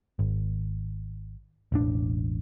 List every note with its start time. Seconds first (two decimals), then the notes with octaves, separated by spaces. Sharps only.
0.19 G#1
1.72 E1 A1 D4